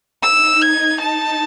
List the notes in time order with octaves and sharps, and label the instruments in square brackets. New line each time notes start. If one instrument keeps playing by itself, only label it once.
[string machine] D#4 [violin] E6
[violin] G#6
A5